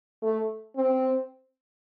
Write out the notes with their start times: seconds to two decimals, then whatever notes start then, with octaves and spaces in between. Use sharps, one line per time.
0.23 A3
0.76 C4